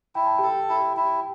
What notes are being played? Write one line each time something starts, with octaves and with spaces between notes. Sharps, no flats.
E4 G5
A5
G4 A4 G5
E4
E4